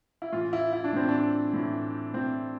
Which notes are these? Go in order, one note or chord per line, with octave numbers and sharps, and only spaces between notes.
E4
A2 E3 F4
E4
E4
D4
A2 E3 C4
D4
A2 E3
A2 E3 C4